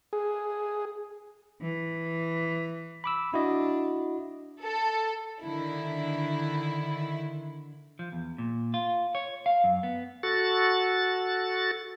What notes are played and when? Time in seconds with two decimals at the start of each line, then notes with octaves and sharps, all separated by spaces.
0.13 G#4
1.61 E3
3.04 B5 D6 E6
3.34 D4 E4 F#4 D#5
4.62 A4
5.43 D3 D#3 E4
7.99 F3
8.12 E2
8.38 A#2
8.74 F4
9.15 C#5
9.46 F5
9.64 F#2
9.83 B3
10.23 F#4 A4 A6